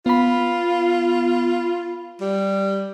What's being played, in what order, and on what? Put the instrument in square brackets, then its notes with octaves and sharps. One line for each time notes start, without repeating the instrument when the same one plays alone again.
[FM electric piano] B3 B5 [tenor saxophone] F4
[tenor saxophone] G3